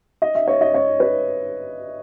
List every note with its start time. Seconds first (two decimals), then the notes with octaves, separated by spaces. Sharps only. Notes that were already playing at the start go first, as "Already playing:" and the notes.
0.22 D#5
0.35 E5
0.48 C#5
0.61 D#5
0.74 C#5
1.00 B4